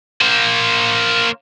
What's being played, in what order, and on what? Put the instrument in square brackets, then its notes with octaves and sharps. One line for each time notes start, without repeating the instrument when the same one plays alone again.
[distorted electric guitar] A#3 C5